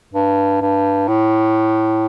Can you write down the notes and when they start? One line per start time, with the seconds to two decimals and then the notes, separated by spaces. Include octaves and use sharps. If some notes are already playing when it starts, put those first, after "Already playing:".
0.14 G2
0.61 G2
1.08 A2